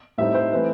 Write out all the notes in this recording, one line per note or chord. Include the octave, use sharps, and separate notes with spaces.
A2 G3 C4 D#4 E5
C5
E3 A3 C4 B4